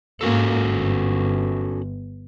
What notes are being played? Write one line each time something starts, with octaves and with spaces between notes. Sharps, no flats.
G#2 A#3 C#4 F#4 A4
G1